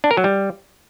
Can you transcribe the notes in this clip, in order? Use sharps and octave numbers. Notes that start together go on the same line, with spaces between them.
D4
A#4
F#3
G3